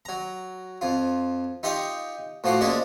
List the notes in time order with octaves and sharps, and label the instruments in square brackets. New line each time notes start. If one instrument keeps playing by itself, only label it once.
[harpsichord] F#3 A#5
F2 F4
D#4 F4 G4 D#5 G5 C#6
A2 F3 F4 F#4 C6 D6
F3 G#3 A#3 C#4 G#4 D5